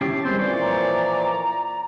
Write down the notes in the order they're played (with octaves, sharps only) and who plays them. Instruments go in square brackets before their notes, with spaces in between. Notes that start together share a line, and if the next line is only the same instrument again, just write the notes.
[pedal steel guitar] C#4 E4 G4 [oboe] A5 [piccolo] C7
[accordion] D#3 E3 G#3 [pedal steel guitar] G3 C4 [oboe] C6 [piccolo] G6
[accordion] A#2 E3 F3 [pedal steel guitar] C#5 C6 [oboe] D5
[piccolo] A#5